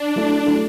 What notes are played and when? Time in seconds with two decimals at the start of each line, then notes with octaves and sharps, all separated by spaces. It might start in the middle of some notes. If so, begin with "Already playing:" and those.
Already playing: D4
0.16 F#3 A3 E4 A4
0.46 F#3 A3 E4 A4